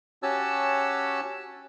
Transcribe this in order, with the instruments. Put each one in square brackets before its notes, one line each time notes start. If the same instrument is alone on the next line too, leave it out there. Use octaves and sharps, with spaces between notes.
[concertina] C#4 F#4 G4 C#5 A5 E6